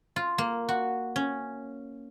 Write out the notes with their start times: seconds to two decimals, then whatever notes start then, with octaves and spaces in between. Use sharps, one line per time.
0.16 F4
0.38 A#3
0.69 F#4
1.16 C#4